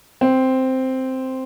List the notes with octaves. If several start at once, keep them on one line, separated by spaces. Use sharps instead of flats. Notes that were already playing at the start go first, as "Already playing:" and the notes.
C4